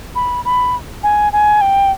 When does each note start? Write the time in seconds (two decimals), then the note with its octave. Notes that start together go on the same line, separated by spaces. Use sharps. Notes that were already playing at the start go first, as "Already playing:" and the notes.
0.15 B5
0.45 B5
1.03 G#5
1.33 G#5
1.61 G5